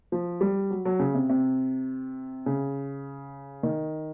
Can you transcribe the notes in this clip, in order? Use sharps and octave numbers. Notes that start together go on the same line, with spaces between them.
F3
G3
F#3
F#3
C#3
C3
C3
C#3
D#3